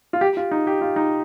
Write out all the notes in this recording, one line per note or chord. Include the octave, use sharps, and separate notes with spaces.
F4
G4
F4
D#4
G4
F4
D#4